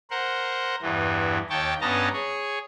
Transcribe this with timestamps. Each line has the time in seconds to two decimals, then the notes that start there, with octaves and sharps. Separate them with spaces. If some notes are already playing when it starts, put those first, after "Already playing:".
0.10 A#4 C5 F#5
0.82 E2 G2 E3
1.50 D#2 C#5 G5 A5
1.81 G2 B3 C#4 D#5 A5 A#5
2.13 G#4 C#5